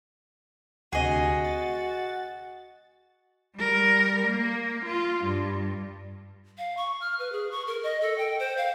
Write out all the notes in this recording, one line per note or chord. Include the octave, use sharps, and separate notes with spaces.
D2 C3 F#4 G#4 D#5
A6
G3 A#4
A#3
F4
G2
F5
C#6
F6
B4
G#4
C#6
A#4
D#5
A4
G5
C5
F5